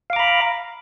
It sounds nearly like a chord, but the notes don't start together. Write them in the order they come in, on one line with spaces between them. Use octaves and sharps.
F5 D6 A#5 B5